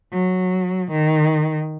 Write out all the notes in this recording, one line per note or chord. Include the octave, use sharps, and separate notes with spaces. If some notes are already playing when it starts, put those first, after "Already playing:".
F#3
D#3